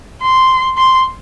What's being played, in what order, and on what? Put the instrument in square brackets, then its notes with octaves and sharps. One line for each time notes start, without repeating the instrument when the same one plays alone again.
[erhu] C6
C6